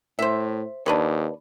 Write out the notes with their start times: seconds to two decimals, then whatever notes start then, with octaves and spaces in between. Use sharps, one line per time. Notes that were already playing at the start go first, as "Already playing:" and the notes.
0.19 A2 C5 E5
0.86 D#2 D4 B4 C#5